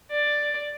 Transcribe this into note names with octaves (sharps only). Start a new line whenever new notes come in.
D5